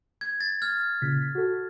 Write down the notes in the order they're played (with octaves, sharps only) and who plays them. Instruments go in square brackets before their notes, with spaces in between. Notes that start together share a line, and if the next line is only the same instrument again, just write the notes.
[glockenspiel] G#6
A6
F6 G#6
[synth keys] A#2 C#3 B6
F#4 A4